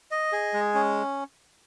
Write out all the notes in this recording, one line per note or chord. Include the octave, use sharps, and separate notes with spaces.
D#5
G#4
G#3
C#4